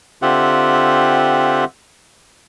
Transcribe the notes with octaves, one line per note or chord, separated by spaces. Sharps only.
D3 C4 F4 G4 E5 F#5